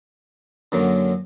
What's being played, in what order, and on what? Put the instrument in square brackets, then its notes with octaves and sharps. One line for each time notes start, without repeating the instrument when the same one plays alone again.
[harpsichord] F#2 D3 F#3 A#3